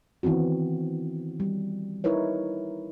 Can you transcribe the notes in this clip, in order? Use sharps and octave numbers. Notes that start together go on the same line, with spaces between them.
D#3 E3 B3 C4 F#4
G3
D#4 E4 A#4 B4 C#5